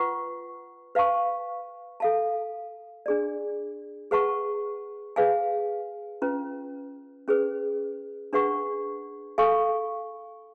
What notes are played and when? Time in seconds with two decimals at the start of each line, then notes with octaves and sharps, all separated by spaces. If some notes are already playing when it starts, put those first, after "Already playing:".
Already playing: F4 B4 F#5 C#6
0.95 B4 F5 A5 C#6
2.00 A4 F5 A5
3.06 D4 G#4 D5
4.11 G#4 B4 F#5 A5 C#6
5.16 G#4 B4 F5 G#5
6.22 C#4 F4 B4
7.28 C#4 G#4 B4
8.33 D4 G#4 B4 F#5 C#6
9.38 A4 F5 G#5 C#6